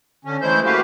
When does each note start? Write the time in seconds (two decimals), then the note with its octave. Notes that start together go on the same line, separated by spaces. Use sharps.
0.25 D3 C#4
0.42 E3 G#3 A3 E4 C5 G6
0.65 A3 A#3 F#4 G4 B4 F5